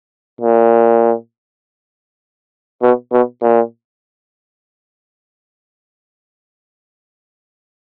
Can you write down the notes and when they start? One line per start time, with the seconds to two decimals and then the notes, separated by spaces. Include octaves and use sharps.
0.41 A#2
2.82 B2
3.12 B2
3.42 A#2